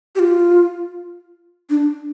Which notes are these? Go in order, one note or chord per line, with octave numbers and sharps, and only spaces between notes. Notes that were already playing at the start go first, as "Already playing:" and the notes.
G4
F4
D4